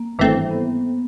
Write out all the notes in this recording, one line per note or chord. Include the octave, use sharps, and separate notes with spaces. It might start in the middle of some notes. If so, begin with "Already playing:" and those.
Already playing: A#3
G#1 G2 E3 A3 C4
B3